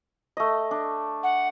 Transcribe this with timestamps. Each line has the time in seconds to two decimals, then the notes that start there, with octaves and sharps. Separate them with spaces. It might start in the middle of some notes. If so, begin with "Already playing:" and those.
0.37 A3 D#5
0.71 D4
1.23 F#5